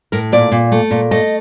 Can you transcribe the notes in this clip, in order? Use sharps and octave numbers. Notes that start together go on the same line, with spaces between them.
A2 A#4
A#2 D5
A#2
A3
A#2
A3 D#5